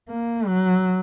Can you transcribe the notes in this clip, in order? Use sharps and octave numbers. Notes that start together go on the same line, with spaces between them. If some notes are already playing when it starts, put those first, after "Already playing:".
A#3
F#3